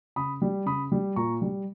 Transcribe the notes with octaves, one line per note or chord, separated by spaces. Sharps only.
C#3 B5 D#6
G3
C#3 B5 D#6
G3
A#2 A#5 C#6
G3